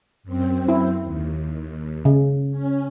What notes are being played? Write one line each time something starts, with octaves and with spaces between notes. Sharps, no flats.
F#2 C4
E4
D#2
C#3
C#4